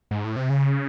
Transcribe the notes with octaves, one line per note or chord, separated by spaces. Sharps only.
G#2
A2
C3
C#3